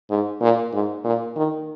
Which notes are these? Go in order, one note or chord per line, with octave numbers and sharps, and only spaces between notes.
G#2
A#2
G#2
A#2
D#3